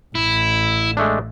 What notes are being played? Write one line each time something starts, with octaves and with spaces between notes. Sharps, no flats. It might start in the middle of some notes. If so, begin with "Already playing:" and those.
A1 E4
G#3 A3 D4